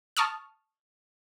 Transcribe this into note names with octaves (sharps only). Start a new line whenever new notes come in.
A5 C#6 D#6 F6